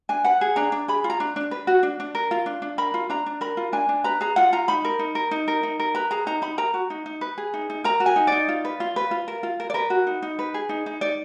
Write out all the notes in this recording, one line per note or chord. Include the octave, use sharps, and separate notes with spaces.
D4 G#5
B4 F#5
G#4
D4 A#5
D4
G#4 B5
F4
A#5
D4
D4
B4
F#4
D4
D4
A#4
F4
D4
D4
A#4 B5
F4
D4 A#5
D4
A#4 B5
F4
D4 G#5
D4
B4 A#5
G#4 A#5
F4 F#5
F4 A#5
D#4 B5
A#4
D#4
A#4
D#4
A#4
D#4
A#4
B4 A#5
G#4 A#5
D#4 A#5
D#4 B5
A#4 A#5
F#4
D#4
D#4
B4
G#4
D#4
D#4
A#4 A#5
F#4
G#5
D#4
D#4 D5
F4
B4
F4
B4
F4
A#4
F4
A#4
D5
A#4 B4
F#4
D#4
D#4
B4
G#4
D#4
D#4
D#4 D5